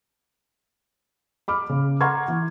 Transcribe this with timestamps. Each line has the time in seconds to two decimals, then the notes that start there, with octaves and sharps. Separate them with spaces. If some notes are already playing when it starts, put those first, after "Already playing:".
1.48 B5 D6 F6
1.69 C#3
2.01 F#5 A#5 C6 C#6 F6 G#6
2.28 E3